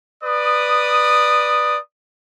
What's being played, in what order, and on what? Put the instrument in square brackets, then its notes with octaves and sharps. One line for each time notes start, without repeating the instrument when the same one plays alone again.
[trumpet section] B4 D5 D#6